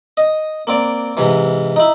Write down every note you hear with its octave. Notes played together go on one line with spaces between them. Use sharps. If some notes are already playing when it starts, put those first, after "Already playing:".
D#5
A#3 C4 D5
G#2 C3 E3
D#4 E4